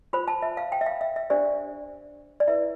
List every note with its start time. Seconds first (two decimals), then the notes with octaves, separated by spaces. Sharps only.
0.13 F4 C5 B5
0.28 A5
0.42 E5
0.57 F5
0.72 G5
0.81 E5
0.86 F5
1.01 E5
1.16 E5
1.30 D4 G4 C5 D5
2.40 D5
2.48 E4 B4 E5